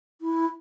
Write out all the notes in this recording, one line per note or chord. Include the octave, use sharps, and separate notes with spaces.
E4